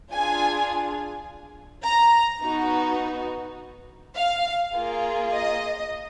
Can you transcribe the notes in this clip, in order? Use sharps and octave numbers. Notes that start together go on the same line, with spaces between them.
D4 F4 G#4 G#5
A#5
B3 D#4 F#4
F5
A#3 F4 G#4
D#5